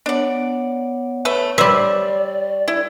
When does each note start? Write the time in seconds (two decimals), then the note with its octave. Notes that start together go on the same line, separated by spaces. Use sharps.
0.06 B3 D4 C#5 D5 F#5
1.25 A3 B4 C#5 E5 C#6
1.58 G3 B4 C5 D5 E5
2.68 E4